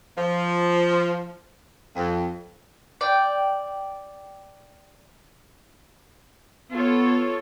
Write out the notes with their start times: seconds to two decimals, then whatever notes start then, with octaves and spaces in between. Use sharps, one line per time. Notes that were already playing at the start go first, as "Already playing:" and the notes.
0.17 F3
1.96 F2
3.01 D5 G5
6.72 B3 F4 A4 C#5